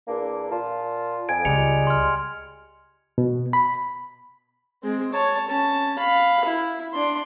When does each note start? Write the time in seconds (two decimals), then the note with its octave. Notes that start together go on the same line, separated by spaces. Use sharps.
0.08 E2 A#3 D4
0.51 A#2 F4 A5
1.29 F2 G#5 G#6 D7
1.45 C#2 G3 G#3 C#7 F7
1.87 C6 F6
3.18 B2
3.53 B5
4.83 G#3 C4
5.12 C#5 A5
5.48 C#4 A5
5.98 F5 B5
6.44 E4
6.94 D4 C6